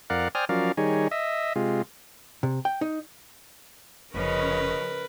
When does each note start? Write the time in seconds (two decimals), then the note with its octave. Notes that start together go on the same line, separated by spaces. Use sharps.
0.10 F2 A#4 D5 F5 F#5
0.35 C5 D5 G5 G#5 D#6 F6
0.49 F3 F#3 C#4 A#4 D5 F5
0.77 D#3 G3 D#4 G#4 C#5
1.11 D#5 E5
1.56 C3 G#3 F4
2.43 C3
2.65 G5
2.81 D#4
4.14 F1 C#3 F3 C#4 A#4 B4 D#5